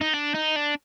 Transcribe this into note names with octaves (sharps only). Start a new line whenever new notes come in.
D#4
D4
D#4
D4